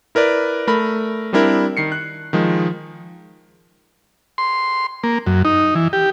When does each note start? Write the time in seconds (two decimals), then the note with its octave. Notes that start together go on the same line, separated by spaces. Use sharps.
0.15 E4 A#4 B4 D5
0.67 A3 A#4 B5
1.33 G3 C4 D4 E4 A#4
1.77 D#3 C7 C#7
1.92 F#6
2.33 D#3 F3 G#3
4.38 C6
5.04 A#3
5.27 F#2
5.45 D#4
5.75 E3
5.93 G4